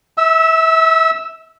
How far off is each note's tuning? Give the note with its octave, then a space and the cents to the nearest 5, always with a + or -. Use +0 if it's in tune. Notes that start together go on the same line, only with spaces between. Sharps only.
E5 -30 E6 +0